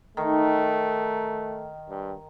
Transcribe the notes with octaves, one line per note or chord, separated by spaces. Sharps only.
D#3 A3
G2